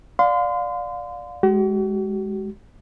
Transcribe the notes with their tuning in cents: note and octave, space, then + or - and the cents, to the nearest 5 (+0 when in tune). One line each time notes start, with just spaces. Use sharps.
D5 +0 F5 +25 C6 -30
G#3 +0 F#4 +45